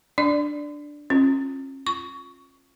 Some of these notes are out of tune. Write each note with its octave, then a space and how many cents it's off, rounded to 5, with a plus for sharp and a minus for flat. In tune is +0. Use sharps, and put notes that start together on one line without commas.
D4 +0 D5 +0
C#4 -40 F4 +0
F4 +0 C#6 +20